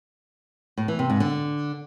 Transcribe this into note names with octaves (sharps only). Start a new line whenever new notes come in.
A2
E3
C3
G#2
D3